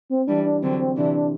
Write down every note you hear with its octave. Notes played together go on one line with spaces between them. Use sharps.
C4
E3 G3 D4
D4
D3 F#3 C4
C4
C3 E3 D4
D4